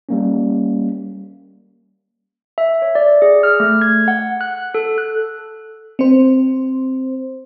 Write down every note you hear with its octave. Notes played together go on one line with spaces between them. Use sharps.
G3 A#3 C#4
E5
C#5
D5
G#4
F6
A3
G#6
F#5
F#6
A4
F#6
C4 C5